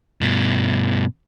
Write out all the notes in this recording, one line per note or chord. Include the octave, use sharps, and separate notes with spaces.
G2 B2